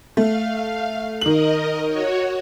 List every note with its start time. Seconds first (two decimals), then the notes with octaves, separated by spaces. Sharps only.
0.17 A3 F5
1.21 D#3 A#4 D#5 F#7
1.87 F#4 C#5